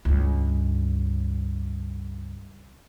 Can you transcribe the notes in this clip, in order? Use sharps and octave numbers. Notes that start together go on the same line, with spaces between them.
C#2 G2